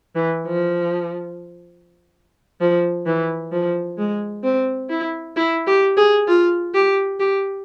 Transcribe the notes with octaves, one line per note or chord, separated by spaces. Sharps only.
E3
F3
F3
E3
F3
G#3
C4
E4
E4
G4
G#4
F4
G4
G4